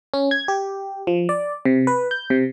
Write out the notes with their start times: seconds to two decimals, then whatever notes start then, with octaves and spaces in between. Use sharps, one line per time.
0.14 C#4
0.31 G#6
0.48 G4
1.07 F3
1.29 D5
1.65 C3
1.87 B4
2.11 G6
2.30 C3